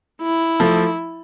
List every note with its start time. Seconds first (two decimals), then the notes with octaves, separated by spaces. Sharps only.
0.22 E4
0.60 F3 A3